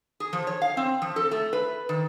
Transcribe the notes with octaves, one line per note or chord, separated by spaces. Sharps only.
G#4
F3
C#5
F5
C4
F3
A4
A3
B4
D#3